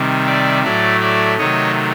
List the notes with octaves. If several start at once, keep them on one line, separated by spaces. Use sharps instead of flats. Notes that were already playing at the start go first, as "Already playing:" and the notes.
Already playing: C3 D#3 G3
D5 E5
A2 F#3 A3 D5 E5
D5 E5
C3 D#3 F#3 A3 C#5 D#5